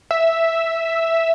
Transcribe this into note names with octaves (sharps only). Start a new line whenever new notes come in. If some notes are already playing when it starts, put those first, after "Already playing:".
E5